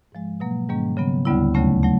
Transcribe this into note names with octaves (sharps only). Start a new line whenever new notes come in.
G#2 F3 G#3
B2 F#3 A#3
G#2 D#3 G3 A#3 C#4
C#3 F#3 B3
D2 D3 G3 B3 E4
D#2 C#3 F#3 A3 C#4
F#3 A3